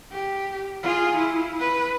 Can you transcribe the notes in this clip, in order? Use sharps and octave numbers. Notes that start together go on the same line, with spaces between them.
G4
F4 G#4
E4
B4